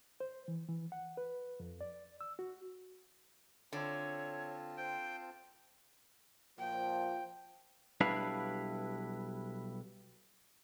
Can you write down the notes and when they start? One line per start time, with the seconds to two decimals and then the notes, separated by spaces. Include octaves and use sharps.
0.20 C5
0.48 E3
0.69 E3
0.92 F#5
1.17 B4
1.60 F2
1.81 D5
2.21 E6
2.39 F#4
3.73 D3 C4 F4 C#5 A5
4.77 C5 G5
6.59 A#2 F3 G5
8.01 B1 G3 D4 E4 B4 F5